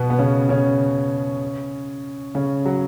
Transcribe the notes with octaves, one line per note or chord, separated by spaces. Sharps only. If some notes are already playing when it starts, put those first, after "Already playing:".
Already playing: B2 B3
B3
C#3 C#4
C#3 C#4
C#3 C#4
F#3